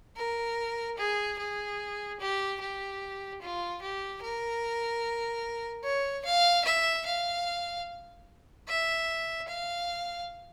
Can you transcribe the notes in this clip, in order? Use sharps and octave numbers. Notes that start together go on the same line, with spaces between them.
A#4
G#4
G#4
G4
G4
F4
G4
A#4
C#5
F5
E5
F5
E5
F5